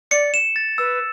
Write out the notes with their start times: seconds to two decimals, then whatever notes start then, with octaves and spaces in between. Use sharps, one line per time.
0.11 D5 C#7
0.34 E7
0.56 A6
0.78 B4 E6